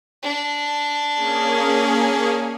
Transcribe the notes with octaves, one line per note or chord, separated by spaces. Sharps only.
D4
A#3 C#4 G#4